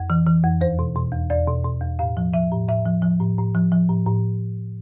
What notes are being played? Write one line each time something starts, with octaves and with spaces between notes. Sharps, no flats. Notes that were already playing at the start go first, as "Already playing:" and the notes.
Already playing: F2
E3
E3
F2
E2 C5
B2
B2
E2
E2 D5
B2
B2
E2
A2 F5
F3
F3 E5
A2
A2 E5
F3
F3
A2
A2
F3
F3
A2
A2